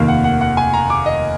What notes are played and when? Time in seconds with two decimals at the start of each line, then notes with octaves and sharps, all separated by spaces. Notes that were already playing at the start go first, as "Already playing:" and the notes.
Already playing: F1 D#2 D#3 A#3 F5
0.08 F#5
0.24 F#5
0.41 F#5
0.57 G#5
0.74 A#5
0.90 D6
1.06 D#5